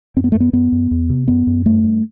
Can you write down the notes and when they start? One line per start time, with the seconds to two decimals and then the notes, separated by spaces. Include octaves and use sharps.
0.16 F#2 C4
0.24 B3
0.32 F#2 A3
0.40 B3
0.53 F#2 B3
0.72 F#2
0.91 E2
1.10 C3
1.28 F#2 B3
1.47 F#2
1.66 G2 A3
1.84 G2